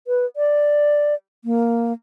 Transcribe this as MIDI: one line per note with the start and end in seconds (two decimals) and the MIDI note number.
0.07 0.26 71
0.36 1.15 74
1.45 1.93 58